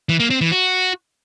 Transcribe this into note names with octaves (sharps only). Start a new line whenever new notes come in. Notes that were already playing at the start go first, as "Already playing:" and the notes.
E3
A#3
C4
E3
F#4